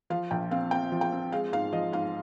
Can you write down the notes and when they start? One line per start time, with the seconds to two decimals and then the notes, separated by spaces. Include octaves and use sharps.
0.10 F3 F5
0.31 A#1 G5
0.51 C4 F5
0.71 C4 G5
0.92 F3
1.01 G5
1.12 C4
1.32 G#3 F5
1.52 G#2 F5
1.73 F3 D#5
1.92 G#2 F5